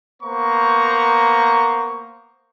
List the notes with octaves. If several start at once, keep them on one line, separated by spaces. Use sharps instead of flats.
A#3 B3 C5 A#5 C#6